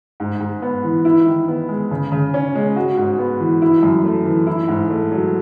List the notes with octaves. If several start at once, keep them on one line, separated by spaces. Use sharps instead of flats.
G#2
G#2
B3
E3
E4
D#3
B3
G#3
C#3
C#3
C#4
G#3
F#4
G#2
B3
E3
E4
F#2
A3
E3
E4
G#2
A3
F#3